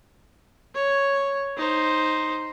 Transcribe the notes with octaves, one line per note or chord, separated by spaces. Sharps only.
C#5
D#4 C5